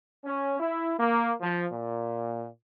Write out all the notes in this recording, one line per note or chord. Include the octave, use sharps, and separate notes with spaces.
C#4
E4
A#3
F3
A#2